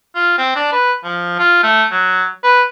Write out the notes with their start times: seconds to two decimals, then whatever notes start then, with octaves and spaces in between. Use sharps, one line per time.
0.15 F4
0.38 C4
0.56 D4
0.72 B4
1.04 F3
1.39 F4
1.63 A3
1.91 F#3
2.43 B4